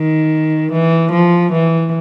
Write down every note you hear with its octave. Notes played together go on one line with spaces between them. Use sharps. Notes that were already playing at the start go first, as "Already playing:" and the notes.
Already playing: D#3
E3
F3
E3